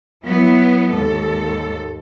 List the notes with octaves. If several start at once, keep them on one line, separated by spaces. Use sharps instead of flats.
F#3 B3 E4
D#2 G#2 A4